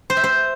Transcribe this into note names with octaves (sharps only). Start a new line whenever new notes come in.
C5
E5
C5